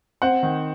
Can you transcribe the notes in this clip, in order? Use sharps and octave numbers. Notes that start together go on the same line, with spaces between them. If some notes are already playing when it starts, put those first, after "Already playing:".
C4 F#5
D#3